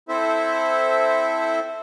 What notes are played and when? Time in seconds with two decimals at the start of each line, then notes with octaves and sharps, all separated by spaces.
0.09 C4 E4 A4 C5 E5